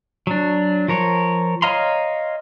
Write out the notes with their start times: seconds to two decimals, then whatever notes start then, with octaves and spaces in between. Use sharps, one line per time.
0.27 F#3 D4
0.88 F3 A#4 C#5
1.62 C#5 D#5 F5 A#5 C6